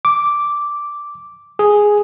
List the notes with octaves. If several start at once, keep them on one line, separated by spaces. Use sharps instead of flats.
D6
G#4